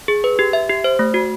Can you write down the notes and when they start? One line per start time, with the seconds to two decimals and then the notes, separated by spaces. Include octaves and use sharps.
0.08 G#4
0.24 B4
0.39 G4
0.53 E5
0.69 G4
0.84 C5
0.99 A3
1.14 F#4